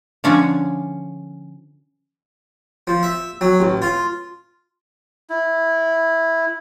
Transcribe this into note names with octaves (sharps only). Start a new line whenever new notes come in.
D3 F3 C#4 D4 G#4
F3
E5
F#3
A1
F4
E4